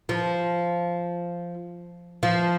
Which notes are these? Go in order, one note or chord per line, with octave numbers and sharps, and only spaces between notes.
F3
F3